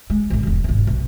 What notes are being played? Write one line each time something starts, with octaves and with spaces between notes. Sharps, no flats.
G#3
A1 D3
E1 G3
D#1 G#1
B1